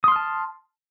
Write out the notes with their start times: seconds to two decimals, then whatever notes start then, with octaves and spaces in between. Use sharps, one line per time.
0.04 D#6
0.08 C6
0.12 F6
0.16 A5